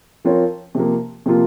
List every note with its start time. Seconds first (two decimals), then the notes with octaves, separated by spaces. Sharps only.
0.25 F3 C4 F4 A#4 C#5
0.75 C3 F3 A#3
1.26 C3 F3 A#3 F4